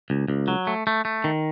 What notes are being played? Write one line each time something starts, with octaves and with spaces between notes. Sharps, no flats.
C#2
C#2
F#3
A3
A3
A3
D#3